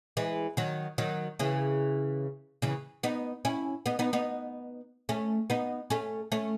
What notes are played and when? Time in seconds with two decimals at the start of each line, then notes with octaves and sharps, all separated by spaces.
0.17 E3 G#3
0.57 D#3 F#3
0.98 D#3 F#3
1.39 C#3 E3
2.62 C#3 E3
3.03 B3 D#4
3.45 C#4 E4
3.86 B3 D#4
3.99 B3 D#4
4.13 B3 D#4
5.09 A3 C#4
5.50 B3 D#4
5.90 A3 C#4
6.32 A3 C#4